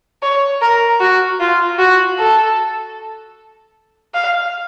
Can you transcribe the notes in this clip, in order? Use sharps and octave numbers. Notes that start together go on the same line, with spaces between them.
C#5
A#4
F#4
F4
F#4
A4
F5